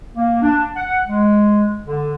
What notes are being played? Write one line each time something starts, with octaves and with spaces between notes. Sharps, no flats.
A#3
D4
F#5
G#3
D3